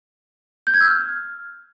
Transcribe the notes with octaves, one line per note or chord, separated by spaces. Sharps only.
G6
G#6
E6
F6